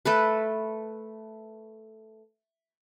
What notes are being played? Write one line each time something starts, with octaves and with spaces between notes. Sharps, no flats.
A3 A4 B4